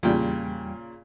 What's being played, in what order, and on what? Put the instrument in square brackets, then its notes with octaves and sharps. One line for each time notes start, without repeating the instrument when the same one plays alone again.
[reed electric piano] E2 G3 G5 [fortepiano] A#2 C#3